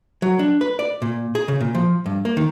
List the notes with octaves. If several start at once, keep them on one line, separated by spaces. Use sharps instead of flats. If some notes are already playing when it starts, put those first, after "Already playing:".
F#3
D4
B4
D5
A#2
G#4
C#3
A#2
F3
G2
A#3
D#3